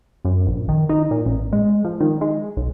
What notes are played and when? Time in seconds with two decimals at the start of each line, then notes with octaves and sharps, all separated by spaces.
0.25 F#2
0.47 A#1
0.69 D#3
0.89 D#4
1.11 A#2
1.26 A1
1.53 G#3
1.85 F3
2.00 D#3
2.21 G#3
2.57 B1